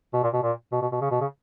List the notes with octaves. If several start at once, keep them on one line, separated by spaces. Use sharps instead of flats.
B2
A#2
B2
A#2
B2
B2
B2
C#3
B2
C#3